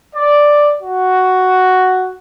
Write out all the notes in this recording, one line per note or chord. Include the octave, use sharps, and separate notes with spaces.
D5
F#4